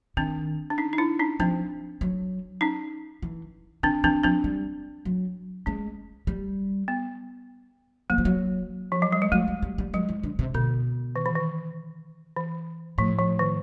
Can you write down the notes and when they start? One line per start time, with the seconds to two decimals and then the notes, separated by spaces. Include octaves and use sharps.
0.17 D#3 C4 D4
0.70 D4
0.78 C#4 D#4
0.93 D#4
0.98 D4 E4
1.19 C#4 D#4
1.40 F3 C4 D4
2.01 F#3
2.61 C#4 D#4
3.22 E3
3.83 D#3 C4 D4
4.04 E3 C4 D4
4.23 F3 C4 D4
4.44 G3
5.05 F#3
5.66 G#3 C#4
6.27 G3
6.88 B3
8.10 F#3 A#3
8.18 F3
8.25 F#3
8.92 F3
9.02 F#3
9.12 G3
9.22 G#3
9.32 F#3 A3
9.48 G3
9.62 G3
9.78 G3
9.94 F#3 G#3
10.09 E3
10.23 D3
10.39 C3
10.54 B2 D3
11.16 D#3
11.26 E3
11.35 D#3
12.37 E3
12.98 A2 F3
13.19 F3
13.39 D#3